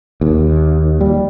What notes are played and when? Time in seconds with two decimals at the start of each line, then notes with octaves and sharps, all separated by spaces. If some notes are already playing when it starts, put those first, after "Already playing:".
0.21 D#2
1.01 G3